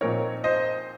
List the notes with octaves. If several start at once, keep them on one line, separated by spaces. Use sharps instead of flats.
A#2 F3 C4 D#4 A#4 C#5
C5 D#5